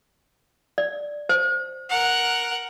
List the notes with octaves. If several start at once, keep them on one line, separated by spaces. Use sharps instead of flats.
D5
C5
A#4 F#5